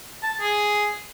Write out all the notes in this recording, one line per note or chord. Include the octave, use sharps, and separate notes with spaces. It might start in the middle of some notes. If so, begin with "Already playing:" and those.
A5
G#4